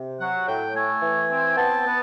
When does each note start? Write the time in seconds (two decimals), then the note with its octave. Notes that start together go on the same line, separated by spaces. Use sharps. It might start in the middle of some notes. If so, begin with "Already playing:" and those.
Already playing: C3
0.20 F#3 F#5
0.47 A2 G5
0.75 A3 G#5
1.02 E3
1.31 C4
1.57 B3 A5
1.86 B3